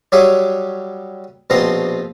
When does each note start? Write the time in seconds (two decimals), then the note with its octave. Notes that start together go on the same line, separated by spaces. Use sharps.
0.12 F#3 G3 G4 G#4 C#5 E5
1.50 A#1 B2 F3 C4 C5 A#5